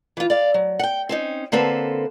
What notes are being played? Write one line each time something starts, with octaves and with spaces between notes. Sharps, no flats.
E3 F4
D5 F5
F#3
F#5 G5
C4 C#4 D#4
D3 A#3 C4 A4 B4